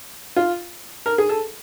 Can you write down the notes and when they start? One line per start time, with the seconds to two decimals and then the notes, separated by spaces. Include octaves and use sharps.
0.36 F4
1.06 A#4
1.18 G#4
1.29 A4